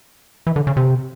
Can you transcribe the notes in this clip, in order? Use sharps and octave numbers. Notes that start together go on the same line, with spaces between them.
E3
D3
C#3
C3